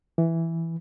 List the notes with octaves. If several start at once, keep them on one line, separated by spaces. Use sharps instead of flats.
E3